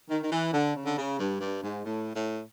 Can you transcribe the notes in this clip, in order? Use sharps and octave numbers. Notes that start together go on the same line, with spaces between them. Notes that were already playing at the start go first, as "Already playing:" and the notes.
D#3
D#3
E3
D3
C#3
D3
C#3
G2
G2
G#2
A2
A2